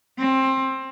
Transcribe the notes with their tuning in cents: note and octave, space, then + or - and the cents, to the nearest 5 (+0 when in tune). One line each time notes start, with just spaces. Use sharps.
C4 +20